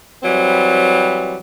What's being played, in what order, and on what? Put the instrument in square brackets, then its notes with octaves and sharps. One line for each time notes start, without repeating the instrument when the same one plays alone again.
[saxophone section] E3 F#3 G3 C4